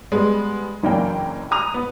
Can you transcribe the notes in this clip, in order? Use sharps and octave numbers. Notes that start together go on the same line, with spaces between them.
G3 G#3 B3
F#1 E3 F#3 A#3 D4 G5
A#5 D#6 F7
B3